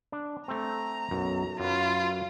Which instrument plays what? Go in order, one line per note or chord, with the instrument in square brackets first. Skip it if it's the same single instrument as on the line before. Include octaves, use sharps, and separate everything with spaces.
[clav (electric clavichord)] D4
[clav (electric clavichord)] A3 C4 [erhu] A#5
[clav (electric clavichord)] B1 F#2
[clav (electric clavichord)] F#2 B4 [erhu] F4